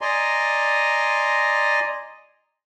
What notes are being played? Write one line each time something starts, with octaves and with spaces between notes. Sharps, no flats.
D5 D#5 G#5 A#5 C6